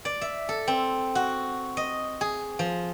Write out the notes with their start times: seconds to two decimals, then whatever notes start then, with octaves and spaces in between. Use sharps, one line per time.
0.05 D5
0.21 E5
0.49 A4
0.68 C4
1.15 F#4
1.77 D#5
2.21 G#4
2.59 F3